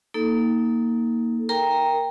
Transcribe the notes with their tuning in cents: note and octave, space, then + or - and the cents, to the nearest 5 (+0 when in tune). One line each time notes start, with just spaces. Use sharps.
A#3 +0 D#4 +25 A4 +0
A#4 +0 G5 +15 A#5 +0